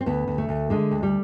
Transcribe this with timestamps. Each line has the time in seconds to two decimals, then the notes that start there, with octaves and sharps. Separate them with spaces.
0.01 C4
0.06 D2 B3
0.28 D2
0.38 A3
0.49 D2
0.70 D3 G#3
0.91 D2
1.03 G3